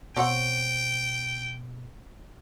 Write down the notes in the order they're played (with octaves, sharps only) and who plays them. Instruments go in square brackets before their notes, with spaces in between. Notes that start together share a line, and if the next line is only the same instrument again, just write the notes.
[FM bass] B2 [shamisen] C4 C#5 F#5 [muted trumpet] G5